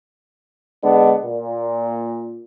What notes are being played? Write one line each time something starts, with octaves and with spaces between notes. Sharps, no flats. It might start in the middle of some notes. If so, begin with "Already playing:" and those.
D3 G#3 B3 D4
A#2